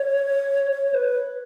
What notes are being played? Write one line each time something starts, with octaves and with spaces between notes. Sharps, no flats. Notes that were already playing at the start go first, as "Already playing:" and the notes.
Already playing: C#5
C#5
B4